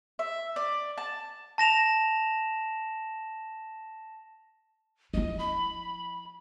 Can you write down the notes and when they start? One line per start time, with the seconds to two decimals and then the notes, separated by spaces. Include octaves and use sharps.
0.19 E5
0.56 D5
0.98 A5
1.58 A5 A#6 E7 F7
5.14 F3 E4 D#5
5.39 B5